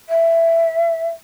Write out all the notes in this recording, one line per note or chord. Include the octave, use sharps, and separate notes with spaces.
E5